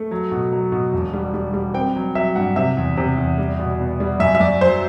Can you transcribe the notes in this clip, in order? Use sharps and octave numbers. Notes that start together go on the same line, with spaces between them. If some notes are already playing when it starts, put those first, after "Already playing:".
Already playing: A3
F#3
B2
F#3
B2
E1
G3
G3
G3
C4 G5
F#3
F#3 E5
G2 F#5
C3 E5
E2
C3
E2
G3
B2
B3
G3
F#2 E5
E5
F#2 D5
F#3 C5